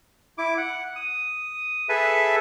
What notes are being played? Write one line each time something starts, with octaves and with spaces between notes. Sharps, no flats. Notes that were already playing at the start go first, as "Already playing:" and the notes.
E4 D6
F#5
D#6
G#4 A4 B4 E5